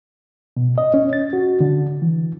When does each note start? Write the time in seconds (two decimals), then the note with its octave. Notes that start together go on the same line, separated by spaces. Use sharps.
0.57 B2
0.78 D#5
0.94 C#4
1.13 A6
1.33 F#4
1.61 D3
2.02 E3